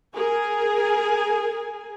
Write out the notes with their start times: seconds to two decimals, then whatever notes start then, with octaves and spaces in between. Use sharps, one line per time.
0.14 G#4 A#4 G#5